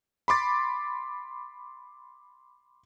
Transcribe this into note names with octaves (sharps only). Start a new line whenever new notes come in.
B5 C6 D6 A6